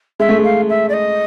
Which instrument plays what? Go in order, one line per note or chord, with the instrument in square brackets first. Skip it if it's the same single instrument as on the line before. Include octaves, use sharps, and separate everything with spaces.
[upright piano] G#3 [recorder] E5
[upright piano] A3
G#3
[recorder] F5
E5
D5
D#5